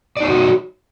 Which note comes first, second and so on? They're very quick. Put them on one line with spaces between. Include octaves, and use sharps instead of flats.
D5 D#4 C#5 F#4